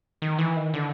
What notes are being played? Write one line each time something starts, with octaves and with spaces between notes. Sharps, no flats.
D#3
E3
D#3
D3